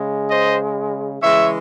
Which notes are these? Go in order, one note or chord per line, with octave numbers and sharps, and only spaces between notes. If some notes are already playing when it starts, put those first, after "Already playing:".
Already playing: C#3 G#3
C5 D#5
C#3 E3 G#3 C#5 E5